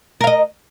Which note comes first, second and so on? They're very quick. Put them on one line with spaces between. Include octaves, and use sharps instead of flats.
A#4 F5 D#5